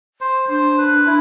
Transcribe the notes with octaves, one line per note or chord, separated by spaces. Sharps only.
C5
D4 C5
B4
E4